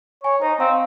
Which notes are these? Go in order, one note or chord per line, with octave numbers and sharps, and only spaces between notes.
C#5 G#5
D#4 C5
C4 F5